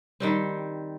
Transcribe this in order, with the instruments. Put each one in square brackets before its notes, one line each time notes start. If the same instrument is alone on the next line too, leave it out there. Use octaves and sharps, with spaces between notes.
[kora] D#3 G3 C4